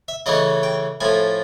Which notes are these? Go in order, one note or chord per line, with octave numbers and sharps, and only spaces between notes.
E5
C#3 E3 A3 C#4 D#5
G5
A2 F3 A3 G#5